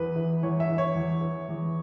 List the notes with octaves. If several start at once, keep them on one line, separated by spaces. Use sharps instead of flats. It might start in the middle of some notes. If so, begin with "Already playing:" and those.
Already playing: E2 B4
E3
E2 C#5
E5
E3
C#5
E2
E3
E2